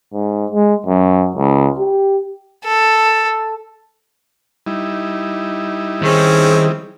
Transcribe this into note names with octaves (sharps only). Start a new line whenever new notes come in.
G#2
G#3
F#2
C#2
G4
A4
G3 D#4 E4
D#3 C4 C#4 G#4